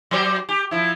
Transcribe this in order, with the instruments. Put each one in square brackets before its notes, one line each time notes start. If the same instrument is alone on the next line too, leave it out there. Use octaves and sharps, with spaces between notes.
[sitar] F#3 G4 C5
G4
F3 E4